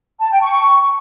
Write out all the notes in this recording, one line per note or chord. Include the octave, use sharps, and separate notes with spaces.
A5
G5
C#6